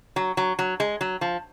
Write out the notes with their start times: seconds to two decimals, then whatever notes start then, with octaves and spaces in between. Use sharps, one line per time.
0.16 F#3
0.37 F#3
0.59 F#3
0.80 G#3
1.01 F#3
1.21 F3